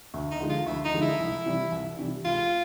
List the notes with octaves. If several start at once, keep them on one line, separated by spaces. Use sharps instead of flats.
D2
D#4
D3 F3 G#3
F4
D2 E4
D#4
D3 F3 G#3
E4
C2
C3 E3 G3
C2
C3 E3 G3
C#2 F4